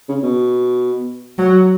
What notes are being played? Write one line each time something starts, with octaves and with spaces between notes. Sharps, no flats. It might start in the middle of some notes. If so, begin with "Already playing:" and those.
C#3
B2
F#3